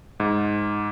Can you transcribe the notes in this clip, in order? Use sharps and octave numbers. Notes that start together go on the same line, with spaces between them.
G#2